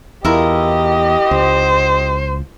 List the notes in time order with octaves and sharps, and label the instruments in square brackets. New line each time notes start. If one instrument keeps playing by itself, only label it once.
[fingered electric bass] E2 [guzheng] E4 F4 A#4 [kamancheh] G4 D#5
[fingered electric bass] C#2 [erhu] C5